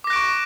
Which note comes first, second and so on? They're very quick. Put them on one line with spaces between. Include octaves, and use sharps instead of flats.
D6 A#6 F#6 D7 C#6